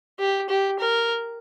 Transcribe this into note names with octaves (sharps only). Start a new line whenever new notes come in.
G4
G4
A#4